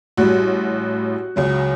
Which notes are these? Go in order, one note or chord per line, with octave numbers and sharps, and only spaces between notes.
A1 A2 G3 F#4
C#2 C#3 F#3